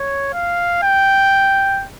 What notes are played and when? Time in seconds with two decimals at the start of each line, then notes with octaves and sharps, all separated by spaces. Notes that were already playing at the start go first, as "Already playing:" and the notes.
Already playing: C#5
0.33 F5
0.83 G5